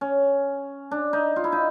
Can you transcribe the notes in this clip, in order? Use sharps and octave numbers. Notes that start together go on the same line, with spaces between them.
C#4
D4
D#4
F4
E4
D#4